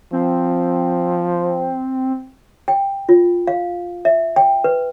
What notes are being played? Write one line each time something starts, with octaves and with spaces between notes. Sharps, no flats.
F3 C4
G5
F4
F5
E5
G5
B4